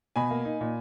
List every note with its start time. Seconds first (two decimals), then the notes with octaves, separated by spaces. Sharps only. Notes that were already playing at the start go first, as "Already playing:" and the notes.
0.16 B2 G#5 B5
0.31 A#3
0.45 D#4
0.61 A#2